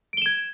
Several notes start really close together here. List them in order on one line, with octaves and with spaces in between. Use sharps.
D7 G7 E7 G#6